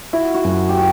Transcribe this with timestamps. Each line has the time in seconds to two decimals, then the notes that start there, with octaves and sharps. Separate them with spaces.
0.13 E4 F#4
0.34 F#4
0.45 F#2
0.69 G4
0.77 F#4